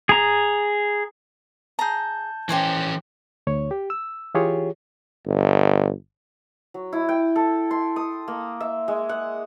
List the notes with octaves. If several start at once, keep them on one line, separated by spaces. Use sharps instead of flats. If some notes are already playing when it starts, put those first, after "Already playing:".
G#4 A#5
G#4 A5 A#5 G6
E3 C#4 G4 C5 G#5
D2 C#5
G4
E6
E3 F4 G4 G#4 C#5
G1
F#3
E4
G5
A4
C6
D#6
A#3
E5
G#3
F#5